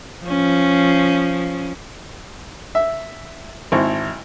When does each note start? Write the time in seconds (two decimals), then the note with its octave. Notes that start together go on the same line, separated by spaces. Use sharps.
0.23 F3 C#4
2.75 E5
3.72 G#1 C4 E4 C#6